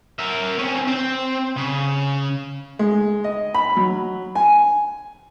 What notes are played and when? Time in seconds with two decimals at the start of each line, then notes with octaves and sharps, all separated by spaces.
0.19 A#4 E5
0.59 C4 C#4
0.88 C4
1.56 C#3
2.79 G#3
3.24 D#5
3.55 B5
3.77 F#3
4.35 G#5